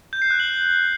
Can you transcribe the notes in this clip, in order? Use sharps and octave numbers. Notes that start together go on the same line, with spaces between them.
G6
C7
F#6
F#7